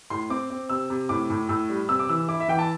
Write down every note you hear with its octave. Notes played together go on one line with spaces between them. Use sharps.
A2 C6
C4 D6
C4
C3 E6
C3
A2 D6
A2
A2 E6
G3
C3 E6
D6
E3 E6
E4 D6
E5
E3 G5
A5